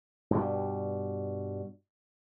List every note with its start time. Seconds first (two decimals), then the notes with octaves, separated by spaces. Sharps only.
0.31 G2 B2 G3